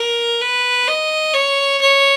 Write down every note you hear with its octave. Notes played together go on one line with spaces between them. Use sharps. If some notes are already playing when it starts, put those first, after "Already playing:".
Already playing: A#4
B4
D#5
C#5
C#5